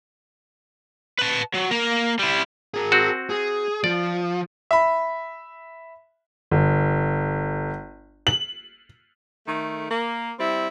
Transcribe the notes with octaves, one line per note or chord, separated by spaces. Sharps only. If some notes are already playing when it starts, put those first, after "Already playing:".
B4 A5
F#3
A#3 A#4
G3 E4
G#4 A#4
C4 F#4
G#4
F3 D5
E5 B5
G1
F#7
D#3 A3
A#3
G3 C4 E4